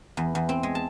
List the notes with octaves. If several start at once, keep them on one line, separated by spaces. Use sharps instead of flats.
E2
E2
C4
G#3
A5